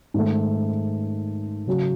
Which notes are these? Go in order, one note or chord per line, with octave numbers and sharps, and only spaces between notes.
G#2 D#3 A3
C#3 F#3 C#4 F#4